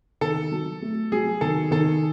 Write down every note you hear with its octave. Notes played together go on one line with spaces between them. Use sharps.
D#3 A4
F#3
A3
F#3 G#4
D#3 A4
D#3 A4